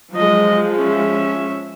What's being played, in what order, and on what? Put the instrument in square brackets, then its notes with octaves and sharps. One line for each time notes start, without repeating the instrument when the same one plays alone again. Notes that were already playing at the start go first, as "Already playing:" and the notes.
[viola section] F3 G#3 [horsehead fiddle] F#3 D#5
[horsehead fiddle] C#4 E5